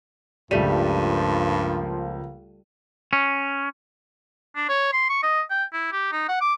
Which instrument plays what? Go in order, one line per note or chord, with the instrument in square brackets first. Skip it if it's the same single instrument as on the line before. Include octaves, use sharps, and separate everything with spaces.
[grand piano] C#2 D#7 [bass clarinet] G2 [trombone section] F3 A#3 [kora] G3 A3
[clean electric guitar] C#4
[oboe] D4
C#5
C6
C#6
D#5
G5
E4
G4
D#4
F#5
D6